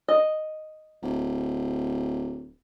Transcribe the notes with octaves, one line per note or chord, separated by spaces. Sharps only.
D#5
D1